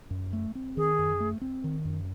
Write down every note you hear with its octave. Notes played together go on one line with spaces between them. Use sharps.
F#2
A3
C4
D#3 G#4
F#2
A3
C4
D#3
F#2